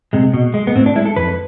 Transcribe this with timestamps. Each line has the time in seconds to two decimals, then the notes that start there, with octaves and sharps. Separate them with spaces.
0.13 C3 G#3
0.34 B2
0.54 G#3
0.67 B3
0.76 A2 C4
0.86 D4
0.95 G#3 E4
1.06 A4
1.16 F2 B4